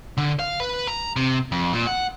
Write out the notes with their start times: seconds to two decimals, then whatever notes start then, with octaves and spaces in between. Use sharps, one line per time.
0.18 D3
0.40 F5
0.60 B4
0.87 A#5
1.16 C3
1.52 F2
1.73 A#2
1.87 F#5